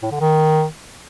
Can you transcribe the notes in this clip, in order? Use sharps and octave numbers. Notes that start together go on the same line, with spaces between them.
A2
D3
D#3